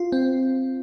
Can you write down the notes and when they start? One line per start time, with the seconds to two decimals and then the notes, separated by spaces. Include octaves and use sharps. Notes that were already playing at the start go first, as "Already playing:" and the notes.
Already playing: F4
0.12 C4